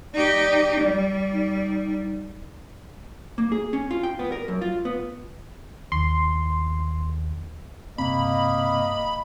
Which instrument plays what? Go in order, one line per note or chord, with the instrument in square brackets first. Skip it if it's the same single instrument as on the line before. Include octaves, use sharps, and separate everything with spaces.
[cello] D#4 G4 [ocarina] D5
[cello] G3
[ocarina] D#4
[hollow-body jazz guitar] A#3
G#4
C#4
F4
G5
B3
A#4
F#2
F4
B3
[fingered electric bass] D#2 [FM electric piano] C6
[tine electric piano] G2 C3 C4 [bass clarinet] A#3 [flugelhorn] D#5 [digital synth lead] B5